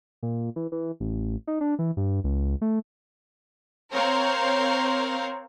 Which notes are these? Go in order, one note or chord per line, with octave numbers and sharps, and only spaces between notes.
A#2
E3
E3
A1
D#4
D4
E3
G2
C#2
A3
C4 A#4 C5 C#5 F5